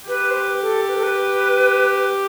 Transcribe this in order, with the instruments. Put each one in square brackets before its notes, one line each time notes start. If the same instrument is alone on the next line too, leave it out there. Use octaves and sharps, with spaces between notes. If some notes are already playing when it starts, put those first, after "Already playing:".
[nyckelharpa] G4 [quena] B4
[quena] C5
B4
A4
B4
A4
B4